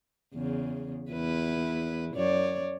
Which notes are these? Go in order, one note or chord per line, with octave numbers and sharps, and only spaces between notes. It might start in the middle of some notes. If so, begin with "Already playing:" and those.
E2 C#3
E2 E4 B4
F#2 C#5 D5